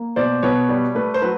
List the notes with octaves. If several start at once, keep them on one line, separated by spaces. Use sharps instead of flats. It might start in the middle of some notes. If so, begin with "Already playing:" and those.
Already playing: A#3
B2 C5 D5
B2 B4 C#5
G3
A3 B4
C5
F#3 B4